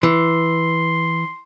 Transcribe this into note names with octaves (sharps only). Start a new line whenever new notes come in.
E3 C6